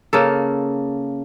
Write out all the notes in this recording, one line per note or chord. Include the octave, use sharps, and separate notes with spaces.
C#3 A#3 A4